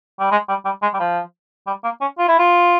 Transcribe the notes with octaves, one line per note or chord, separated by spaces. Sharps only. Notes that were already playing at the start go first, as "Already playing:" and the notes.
G3
G#3
G3
G3
G#3
G3
F3
G3
A#3
C#4
F4
E4
F4